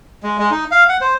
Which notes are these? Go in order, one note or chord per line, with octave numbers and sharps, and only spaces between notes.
G#3
G#3
D#4
F5
F#5
C5